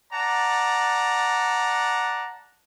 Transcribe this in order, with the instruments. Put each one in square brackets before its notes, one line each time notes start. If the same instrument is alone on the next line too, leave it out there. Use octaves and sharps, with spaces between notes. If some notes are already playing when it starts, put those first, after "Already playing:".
[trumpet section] D5 F#5 A5 A#5